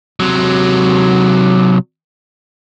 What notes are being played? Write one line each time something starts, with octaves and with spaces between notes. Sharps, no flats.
C3 F#3